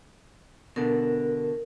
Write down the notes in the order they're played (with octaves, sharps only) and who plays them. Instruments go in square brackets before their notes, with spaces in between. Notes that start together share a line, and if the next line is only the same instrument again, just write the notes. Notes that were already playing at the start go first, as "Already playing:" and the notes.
[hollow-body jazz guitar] B2 D3 [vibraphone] A#4